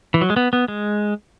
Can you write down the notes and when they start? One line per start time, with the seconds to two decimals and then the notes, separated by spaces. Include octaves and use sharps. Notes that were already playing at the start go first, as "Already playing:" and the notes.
0.14 E3
0.21 F#3
0.30 G#3
0.36 B3
0.53 B3
0.68 G#3